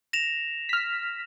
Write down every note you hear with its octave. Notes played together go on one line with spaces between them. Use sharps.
A#6 E7 F7
F6 B6